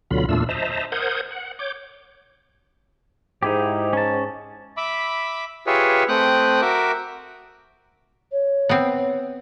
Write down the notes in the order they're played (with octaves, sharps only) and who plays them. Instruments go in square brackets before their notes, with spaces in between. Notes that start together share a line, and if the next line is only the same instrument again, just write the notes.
[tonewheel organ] D2 B2 D3 F#3 F4 B5
E2 A#2 A3 D4 F4 E6
C5 D#5 E5 A5 A#5
A#4 C5 F#5 D#6 G6 G#6
F#5
C#5 D6 G6
[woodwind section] G#2 [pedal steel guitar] D#4 E4 G4
[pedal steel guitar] C#4 A5
[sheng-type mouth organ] E5 B5 D6
F4 G4 G#4 B4 C#5 E5
A3 C4 G5 D#6 F#6
F#4 A#4 E5 D6
[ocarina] C#5
[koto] B3 C4